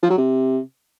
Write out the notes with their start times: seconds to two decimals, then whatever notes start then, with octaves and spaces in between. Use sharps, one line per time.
0.03 F3
0.10 F#3
0.18 C3